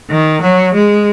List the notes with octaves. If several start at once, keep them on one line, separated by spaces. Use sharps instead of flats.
D#3
F#3
G#3